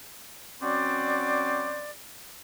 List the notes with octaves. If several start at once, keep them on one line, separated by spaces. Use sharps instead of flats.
F#3 C4 C#4 F#4 C5 D5